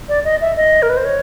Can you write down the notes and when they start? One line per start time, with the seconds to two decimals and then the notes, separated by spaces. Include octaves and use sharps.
0.09 D5
0.25 D#5
0.41 E5
0.57 D#5
0.82 A#4
0.90 B4
0.97 C5
1.05 C#5